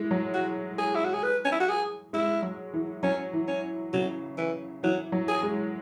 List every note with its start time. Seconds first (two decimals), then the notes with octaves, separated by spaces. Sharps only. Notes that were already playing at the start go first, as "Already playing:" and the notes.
Already playing: E3 G#3
0.11 F#3
0.34 F#4
0.78 G#4
0.95 E4
1.05 F#4
1.14 G#4
1.23 B4
1.44 C#4
1.52 E4
1.60 F#4
1.69 G#4
2.13 G#3 E4
2.42 F#3
2.74 E3
3.03 F#3 C#4
3.33 E3
3.48 C#4
3.93 C#3 F#3
4.37 E3
4.83 E3 F#3
5.12 F#3
5.28 G#4
5.43 G#3